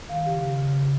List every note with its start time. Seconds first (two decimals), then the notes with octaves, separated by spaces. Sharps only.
0.09 D#3 F5
0.26 C#3 G4
0.42 C#3
0.58 C#3
0.75 C#3